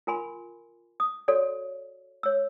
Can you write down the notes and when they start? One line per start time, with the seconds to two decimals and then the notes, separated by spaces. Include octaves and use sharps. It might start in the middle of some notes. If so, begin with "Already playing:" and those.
0.07 F4 A#4 G#5 B5 C6
1.00 D#6
1.28 F#4 A4 C#5 D5
2.23 C#5 E6